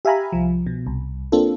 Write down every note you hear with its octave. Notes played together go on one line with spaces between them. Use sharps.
G4 E5 F5 G#5 A#5 B5
C2 F3
B2
C2
A#3 C4 D4 F4 A4